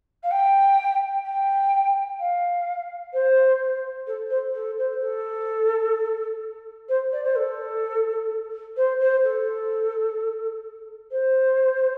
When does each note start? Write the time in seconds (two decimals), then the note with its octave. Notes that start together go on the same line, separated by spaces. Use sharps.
0.22 F5
0.30 G5
1.25 G5
2.19 F5
3.13 C5
4.07 A4
4.30 C5
4.54 A4
4.77 C5
5.01 A4
6.88 C5
7.12 D5
7.23 C5
7.35 A4
8.76 C5
8.99 C5
9.23 A4
11.11 C5